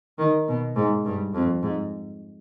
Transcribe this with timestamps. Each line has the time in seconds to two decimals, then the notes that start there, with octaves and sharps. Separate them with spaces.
0.19 D#3
0.48 B2
0.76 G#2
1.05 G2
1.34 F2
1.63 G#2